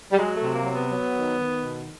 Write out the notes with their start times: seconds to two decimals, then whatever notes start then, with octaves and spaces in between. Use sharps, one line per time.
0.11 G3
0.17 F#3 G#3
0.35 A3
0.41 C3
0.53 A#3
0.65 F#3
0.72 B3
0.90 F#3
1.14 D#3
1.39 D#3
1.63 B2